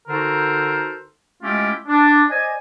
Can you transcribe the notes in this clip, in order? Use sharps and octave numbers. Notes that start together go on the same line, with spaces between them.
D3 D#4 F#4 A4 A#4 C5
G#3 A3 C#4 E4 F4 G4
D4
C5 D5 D#5 G#5